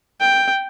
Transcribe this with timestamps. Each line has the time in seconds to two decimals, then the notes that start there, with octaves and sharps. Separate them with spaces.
0.21 G5